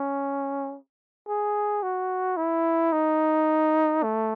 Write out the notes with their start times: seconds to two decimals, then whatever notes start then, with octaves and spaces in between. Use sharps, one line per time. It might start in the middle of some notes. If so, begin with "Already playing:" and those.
Already playing: C#4
1.28 G#4
1.83 F#4
2.37 E4
2.92 D#4
4.03 A3